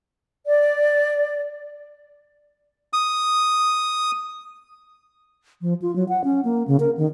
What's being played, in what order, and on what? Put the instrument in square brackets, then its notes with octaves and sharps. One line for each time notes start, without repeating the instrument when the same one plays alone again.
[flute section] D5
[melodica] D#6
[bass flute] F3
F4
F#3
F#5
C#4
A#3
C#3
A#4
D#3